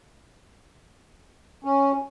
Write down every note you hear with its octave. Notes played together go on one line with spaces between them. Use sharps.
C#4